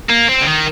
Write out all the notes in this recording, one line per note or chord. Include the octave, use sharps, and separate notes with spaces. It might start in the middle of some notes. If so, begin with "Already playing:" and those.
A#3
C4
D3
D#3